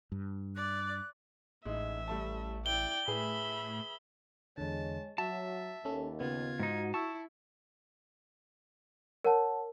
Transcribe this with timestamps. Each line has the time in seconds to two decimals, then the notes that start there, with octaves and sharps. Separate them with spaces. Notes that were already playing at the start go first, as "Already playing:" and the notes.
0.12 G2
0.56 D5 F#6
1.65 A1 G#3 D#4 E5
2.08 G3 A3 A5
2.66 E4 D5 G5 G7
3.08 A2 G#4 B4 E5 B5
4.58 E2 D3 G#3 C#5 A5
5.18 F#3 F#4 E5 A5
5.85 D#2 C#4 A4
6.20 C#3 B3 F4 G#6
6.59 G#2 D#4 F#4
6.94 E4 A5 C#6 E6
9.24 A#4 C#5 F#5 A5